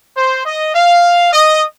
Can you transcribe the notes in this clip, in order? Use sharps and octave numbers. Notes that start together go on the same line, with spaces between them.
C5
D#5
F5
D#5